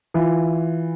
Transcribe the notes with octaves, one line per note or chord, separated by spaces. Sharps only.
E3 F4